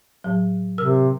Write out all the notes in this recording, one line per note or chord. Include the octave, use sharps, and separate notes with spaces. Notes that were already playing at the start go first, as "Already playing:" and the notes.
A2 F#3
C3 A#4 E6 F6